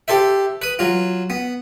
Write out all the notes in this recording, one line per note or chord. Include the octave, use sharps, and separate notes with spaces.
G4 A4 C5 E5
B4 D#6
F#3 F4
B3